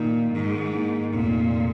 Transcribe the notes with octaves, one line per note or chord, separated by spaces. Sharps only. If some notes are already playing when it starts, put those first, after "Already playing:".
Already playing: A#2 D#3 A#3 D#4
G#2 D#3
A#3 D#4
F1 A#2